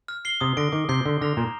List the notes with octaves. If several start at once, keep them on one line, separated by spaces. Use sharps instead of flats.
F6
C7 G7
C3 D#6
D3 A#6 D7
D#3 D6
C3 G6 C7 G7
D3 C6
D3 F6 A#6 F7
A#2 A#5